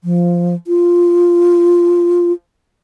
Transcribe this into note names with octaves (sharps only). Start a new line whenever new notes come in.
F3
F4